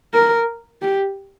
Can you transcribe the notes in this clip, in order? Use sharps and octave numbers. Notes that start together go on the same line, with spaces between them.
A#4
G4